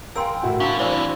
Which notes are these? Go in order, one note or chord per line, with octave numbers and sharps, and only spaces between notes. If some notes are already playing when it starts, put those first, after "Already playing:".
A#4 F5 G5 G#5 C6 E6
A2 E4 F#4
B2 D4 F5 G#5 A#5
E3 C4 E4 C5 D5